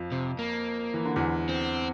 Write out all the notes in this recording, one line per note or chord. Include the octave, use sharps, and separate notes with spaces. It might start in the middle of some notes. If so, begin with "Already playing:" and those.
Already playing: F2 F3
C3
A#3
E3
D3
E2 E3
C4